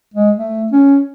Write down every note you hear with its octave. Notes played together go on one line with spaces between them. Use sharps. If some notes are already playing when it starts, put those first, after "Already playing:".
G#3
A3
C#4